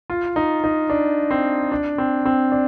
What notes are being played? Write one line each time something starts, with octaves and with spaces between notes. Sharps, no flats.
F4
D#4
D#4
D4
C4
D4
C4
C4
D4